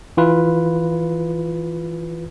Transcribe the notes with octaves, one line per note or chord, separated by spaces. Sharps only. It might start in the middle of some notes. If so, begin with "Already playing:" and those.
E3 F4 B4